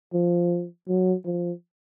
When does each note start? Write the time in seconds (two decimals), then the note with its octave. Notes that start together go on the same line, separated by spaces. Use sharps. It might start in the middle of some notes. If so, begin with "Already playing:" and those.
0.14 F3
0.88 F#3
1.25 F3